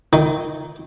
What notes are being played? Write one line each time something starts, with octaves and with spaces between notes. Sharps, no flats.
D#3